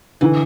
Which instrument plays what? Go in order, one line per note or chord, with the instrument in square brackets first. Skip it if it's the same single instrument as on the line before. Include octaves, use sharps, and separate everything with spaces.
[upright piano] D3 [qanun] E3